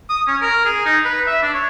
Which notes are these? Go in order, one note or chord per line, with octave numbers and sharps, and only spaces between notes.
D#6
C#4
A#4
G#4
D#4
B4
E5
D4
C#5